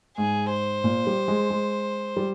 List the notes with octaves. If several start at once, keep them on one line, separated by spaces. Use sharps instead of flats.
G#2 G#4
C5
A#2
G3
G#3
G#3
G3